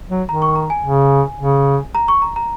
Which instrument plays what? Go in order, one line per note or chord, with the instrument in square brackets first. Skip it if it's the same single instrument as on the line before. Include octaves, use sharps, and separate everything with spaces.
[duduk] F#3
[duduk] D#3 [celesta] A#5
[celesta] C#6
A#5
G#5
[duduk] C#3
C#3
[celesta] A#5
C#6
A#5
A#5